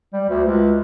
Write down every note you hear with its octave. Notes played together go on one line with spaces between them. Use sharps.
G3
D2
C#2